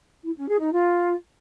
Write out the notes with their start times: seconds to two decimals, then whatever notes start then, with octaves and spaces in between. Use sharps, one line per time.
0.24 E4
0.36 C#4
0.48 G#4
0.59 D#4
0.71 F4